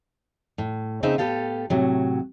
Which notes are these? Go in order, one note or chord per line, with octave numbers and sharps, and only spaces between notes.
A2
C#3 A#3 C4 D#4 E5
A2 B3 G4 A4 F5
A2 C3 F#3